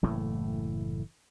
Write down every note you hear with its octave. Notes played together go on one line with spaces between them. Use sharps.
F#1 A2 E3 A3